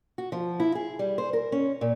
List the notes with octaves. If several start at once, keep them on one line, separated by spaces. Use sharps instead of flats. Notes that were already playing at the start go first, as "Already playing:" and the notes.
F#4
F3
E4
G#4
G3
C5
A#4
C#4
A#2